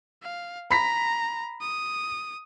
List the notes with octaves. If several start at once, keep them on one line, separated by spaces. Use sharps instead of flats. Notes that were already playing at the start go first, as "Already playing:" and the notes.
F5
A#5 B5 B6
D#6